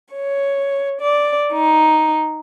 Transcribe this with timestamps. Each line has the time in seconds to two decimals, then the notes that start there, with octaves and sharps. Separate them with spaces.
0.15 C#5
1.01 D5
1.53 D#4